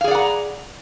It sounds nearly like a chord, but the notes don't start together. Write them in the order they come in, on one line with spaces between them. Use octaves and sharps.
F5 G#4 D5 F#5 A#5